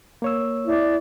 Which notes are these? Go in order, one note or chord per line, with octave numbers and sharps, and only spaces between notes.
A#3 C#5 E6
E4 D5